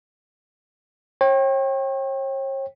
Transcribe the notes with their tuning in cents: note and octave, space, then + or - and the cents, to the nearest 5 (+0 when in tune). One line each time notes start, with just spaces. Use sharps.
C#5 -40 G5 +0